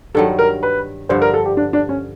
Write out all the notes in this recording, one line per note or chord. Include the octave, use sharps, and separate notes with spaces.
G2 D#3 F#3 A4
A#4
B4
G2 D3 F3 C5
A#4
A4
G4
D4
D4
C#4